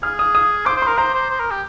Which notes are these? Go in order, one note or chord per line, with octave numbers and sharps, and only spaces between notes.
G#4 F6
D#6
D#6
C5 D6
C5
C6
A#4
C5 A#5
C5
C5
A#4
G4